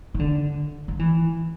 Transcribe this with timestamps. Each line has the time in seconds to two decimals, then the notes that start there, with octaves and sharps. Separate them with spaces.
0.14 D#3
0.19 D3
0.88 F3
0.99 E3